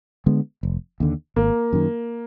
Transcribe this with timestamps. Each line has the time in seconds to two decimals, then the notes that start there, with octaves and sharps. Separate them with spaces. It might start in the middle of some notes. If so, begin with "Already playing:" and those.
0.26 D3 G#3 B3
0.63 F1
1.00 D#2 D3
1.36 G#1 A#3
1.73 F#2 D#3